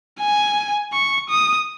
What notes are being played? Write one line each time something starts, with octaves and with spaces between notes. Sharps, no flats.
G#5
C#6
D#6